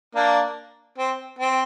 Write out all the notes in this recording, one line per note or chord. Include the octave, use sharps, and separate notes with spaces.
A#3 D4
C4
C4